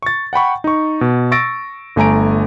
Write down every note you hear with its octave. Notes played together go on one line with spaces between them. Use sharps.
C#6 A6
F#5 G5 B5 C#6
D#4 C#6
B2
C#6 E6 A6 A#6 D7
G1 A3 G#5 A#5 D7